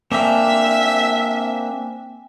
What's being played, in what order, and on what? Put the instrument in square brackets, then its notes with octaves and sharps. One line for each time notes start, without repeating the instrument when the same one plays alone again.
[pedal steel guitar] A#3 C4 D4 [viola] E5 [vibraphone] G5 G#5